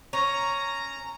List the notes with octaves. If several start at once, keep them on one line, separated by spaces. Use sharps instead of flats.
C#4 A#5